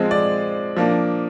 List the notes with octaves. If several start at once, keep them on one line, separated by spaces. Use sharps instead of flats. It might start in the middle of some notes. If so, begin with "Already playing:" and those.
Already playing: F3 G#3 C4
D5
F3 A#3 D4